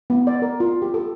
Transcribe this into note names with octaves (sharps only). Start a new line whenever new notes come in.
B3
D5
A#4
F4
G4
A4